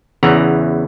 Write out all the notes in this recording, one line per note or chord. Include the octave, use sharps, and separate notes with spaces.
E2 C#3 E3 F#5 A#5